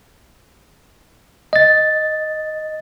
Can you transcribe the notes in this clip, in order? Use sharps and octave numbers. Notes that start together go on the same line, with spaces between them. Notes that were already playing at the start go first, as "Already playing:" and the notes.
D#5 A6